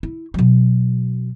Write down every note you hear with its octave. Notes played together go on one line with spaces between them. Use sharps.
E4
B2 F#3